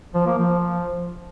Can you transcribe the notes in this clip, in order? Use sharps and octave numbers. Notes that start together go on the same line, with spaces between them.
F3
A#3
F3